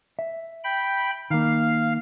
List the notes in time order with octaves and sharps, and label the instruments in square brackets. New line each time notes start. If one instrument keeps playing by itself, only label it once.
[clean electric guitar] E5
[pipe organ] G5 B5
[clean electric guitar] D#3 A#3 [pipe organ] F5